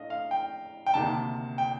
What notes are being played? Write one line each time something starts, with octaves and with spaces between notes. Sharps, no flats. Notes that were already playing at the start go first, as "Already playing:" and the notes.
Already playing: A2 A3 D4 D#5 F5
F5
G5
G5
D2 C3 D#3 A#3 A5
G5